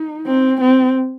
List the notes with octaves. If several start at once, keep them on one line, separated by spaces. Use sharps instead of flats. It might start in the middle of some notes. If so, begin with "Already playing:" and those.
Already playing: D#4
C4
C4